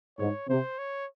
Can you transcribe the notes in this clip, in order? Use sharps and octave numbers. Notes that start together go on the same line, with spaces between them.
G#2 C#5
C3 C5
C#5